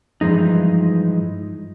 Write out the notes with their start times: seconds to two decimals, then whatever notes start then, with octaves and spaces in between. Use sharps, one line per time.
0.21 G2 E3 F3 G#3 D#4